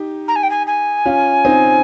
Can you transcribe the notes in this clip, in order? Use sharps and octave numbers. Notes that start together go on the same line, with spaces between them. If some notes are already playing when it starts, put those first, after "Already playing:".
Already playing: D#4 G4
A#5
G#5
G5
G#5
G#5
C#4 F4
C4 D#4